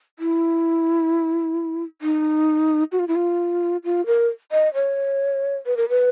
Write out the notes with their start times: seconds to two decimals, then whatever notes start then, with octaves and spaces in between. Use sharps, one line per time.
0.19 E4
2.02 D#4
2.92 F#4
2.99 F4
3.08 E4
3.16 F4
3.84 F4
4.06 A#4
4.52 D#5
4.74 C#5
5.66 B4
5.77 A#4
5.89 B4